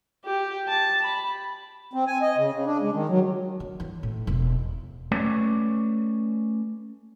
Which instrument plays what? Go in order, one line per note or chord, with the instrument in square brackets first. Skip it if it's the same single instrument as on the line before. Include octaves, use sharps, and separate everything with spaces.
[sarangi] G4
A5
B5
[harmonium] C4
G#5
D#5
C#3
C#3
D4
G#3
D#3
F#3
[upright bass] D3
E3
A2
E1
[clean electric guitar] A3 C#4 B4 C#5 D5